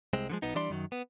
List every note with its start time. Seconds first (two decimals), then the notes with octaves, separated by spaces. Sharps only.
0.13 C2 G#3 C4
0.30 D3 F3 G#3
0.42 B1 B3 D#4
0.55 E3 G3 D4 D5 C6
0.70 F#2 D#3 F#3
0.92 B3